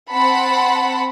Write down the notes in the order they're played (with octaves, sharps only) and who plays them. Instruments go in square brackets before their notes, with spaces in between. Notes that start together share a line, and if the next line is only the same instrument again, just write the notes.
[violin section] C4 F#5 A5 B5